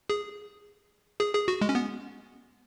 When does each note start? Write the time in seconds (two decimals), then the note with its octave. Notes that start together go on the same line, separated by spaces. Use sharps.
0.10 G#4
1.20 G#4
1.34 G#4
1.48 F#4
1.61 G#3
1.69 C#4
1.75 B3